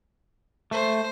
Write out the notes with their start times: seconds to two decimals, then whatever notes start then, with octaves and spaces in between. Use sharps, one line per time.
0.71 A3 C5